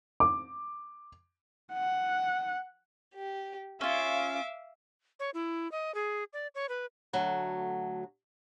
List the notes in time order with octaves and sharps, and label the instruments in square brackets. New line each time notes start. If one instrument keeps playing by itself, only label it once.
[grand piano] D6
[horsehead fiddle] F#5
[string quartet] G4
[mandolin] C#4 F4 [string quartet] E5 F5 D6
[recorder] C#5
E4
D#5
G#4
D5
C#5
B4
[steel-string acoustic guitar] D2 F#3 A3